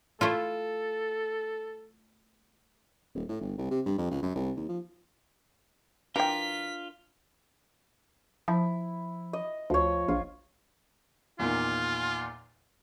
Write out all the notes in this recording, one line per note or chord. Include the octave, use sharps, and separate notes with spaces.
A3 E4 F4 A4
D#1
A2
G1
C2
C3
G2
F2
C#2
F#2
C2
D#2
F3
E3 D4 F4 A#4 G5 B6
F3 E4
D#5
D2 F3 C#5
A#1 F4
E2 A#2 D#3 F4